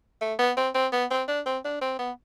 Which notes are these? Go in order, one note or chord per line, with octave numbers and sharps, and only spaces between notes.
A3
B3
C4
C4
B3
C4
D4
C4
D4
C4
B3